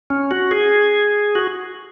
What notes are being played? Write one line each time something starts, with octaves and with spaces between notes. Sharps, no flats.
C#4
F#4
G#4
F#4